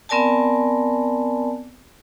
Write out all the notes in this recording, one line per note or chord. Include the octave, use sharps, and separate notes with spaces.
B3 C4 A#4 D5 G#5 A5